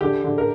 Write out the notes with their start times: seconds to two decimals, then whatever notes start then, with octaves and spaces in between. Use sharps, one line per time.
0.01 D3 G4
0.24 D3
0.38 A#4